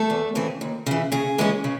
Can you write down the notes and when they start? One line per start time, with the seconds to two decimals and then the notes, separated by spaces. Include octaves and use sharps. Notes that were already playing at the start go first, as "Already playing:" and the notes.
Already playing: A3 A4
0.10 E2
0.35 C#3 E3 C4
0.61 D#2
0.86 C#3 E3
1.12 C#3 G#4
1.38 E3 G#3 C#4
1.64 C#3